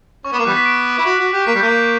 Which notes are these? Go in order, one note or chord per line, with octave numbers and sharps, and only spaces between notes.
C#4 C#6
B3
D6
A#3
E3 G3 B3 F#6
B6
D7
E4
F#4
F#4
G4
A#3 B6
G3
A#3 G6
G6